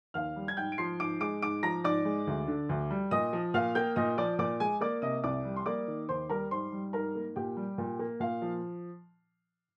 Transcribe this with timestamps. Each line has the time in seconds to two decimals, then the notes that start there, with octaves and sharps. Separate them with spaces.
0.14 D#2 F5 F6
0.36 G3
0.48 G#6
0.57 G#2 G5 G6
0.72 D7
0.78 F3 C6 C7
1.00 G#2 D6 D7
1.20 G#3 D6 D7
1.42 G#2 D6 D7
1.63 F3 A#5 A#6
1.84 G#2 D5 D6
2.05 G#3
2.27 D2
2.48 D3
2.69 D2
2.90 G3
3.11 A#2 D#5 D#6
3.33 F3
3.54 A#2 F5 F6
3.75 A#3 G5 G6
3.96 A#2 D#5 D#6
4.18 F3 D5 D6
4.39 A#2 D5 D6
4.60 G#3 G#4 G#5
4.81 A#3 D5 D6
5.02 C3 D#5 D#6
5.24 C2 D5 D6
5.45 G3
5.56 C6
5.66 A#3 D5 D6
5.88 D#3
6.09 D#2 C5 C6
6.30 G3 A#4 A#5
6.51 G#2 C5 C6
6.72 G3
6.93 G#2 A#4 A#5
7.15 A#3
7.36 A#2 G4 G5
7.57 G3
7.78 A#2
7.99 A#3
8.20 A#2 F5
8.42 F3